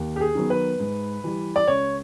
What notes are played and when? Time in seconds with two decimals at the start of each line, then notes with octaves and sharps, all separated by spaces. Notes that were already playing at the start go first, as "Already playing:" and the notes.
Already playing: D#2
0.16 G4
0.21 G#4
0.35 D#3 F#3 B3
0.50 B4
0.80 G#2
1.24 E3 G3
1.56 D5
1.68 C#2 C#5